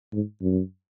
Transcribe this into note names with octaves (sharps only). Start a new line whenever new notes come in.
G#2
F#2